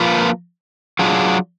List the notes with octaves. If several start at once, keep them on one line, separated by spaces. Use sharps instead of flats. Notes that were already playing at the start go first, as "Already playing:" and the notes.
Already playing: F3 A#3 F4 B4
F#3 D4 F4 G#4